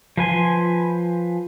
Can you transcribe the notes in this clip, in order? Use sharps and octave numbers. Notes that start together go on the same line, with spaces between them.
F3 B4 G#5 C6